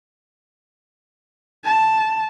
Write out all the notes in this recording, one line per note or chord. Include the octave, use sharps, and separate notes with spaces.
A5